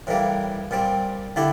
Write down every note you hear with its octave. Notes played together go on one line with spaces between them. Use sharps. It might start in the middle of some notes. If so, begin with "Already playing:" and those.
A2 E3 G3 A#3
A#2 G3 C4
D3 A3 E4 G4